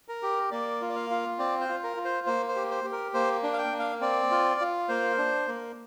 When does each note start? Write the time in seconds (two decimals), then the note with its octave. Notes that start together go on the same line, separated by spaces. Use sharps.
0.08 A#4
0.23 G4
0.51 A#3 D5
0.81 F4
0.89 D5
0.95 F5
1.10 F4
1.38 C4 D5
1.60 C5
1.69 F4
1.83 A#4
1.97 F4
2.05 C5
2.27 A#3 C5
2.48 C5
2.56 G4
2.71 C5
2.84 G4
2.92 A#4
3.14 A#3 C5
3.43 D4
3.53 F5
3.58 G5
3.72 A#3
3.79 F5
4.01 C4 D5
4.31 F4
4.60 F4
4.89 A#3 C5
5.18 D4
5.47 A#3